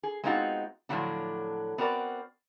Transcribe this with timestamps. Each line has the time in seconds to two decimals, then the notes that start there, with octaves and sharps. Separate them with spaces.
0.03 G#4
0.24 G#3 B3 C4 D#4 F4 F#4
0.89 A2 D3 F3 F#3 B3 D4
1.78 B3 C4 F#4 A#4 D5